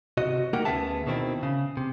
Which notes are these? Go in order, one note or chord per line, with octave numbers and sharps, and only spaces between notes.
C3 F#4 D#5
A3 A#3 D#4 G4 A#4 F#5
D2 B3 C#4 G#4 E5 A5
B2 D#3 C4 E4
C#3
C3